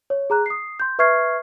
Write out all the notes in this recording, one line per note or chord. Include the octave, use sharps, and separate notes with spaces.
C#5
G#4 A#5 F#6
D#6 C7
C6 G6
B4 E5 C#6 F6 G#6 C7